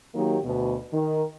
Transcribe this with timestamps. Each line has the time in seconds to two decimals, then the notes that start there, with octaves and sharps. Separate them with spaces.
0.14 D#3 F#3 A#3 D#4 G4
0.45 D2 B2
0.93 D#3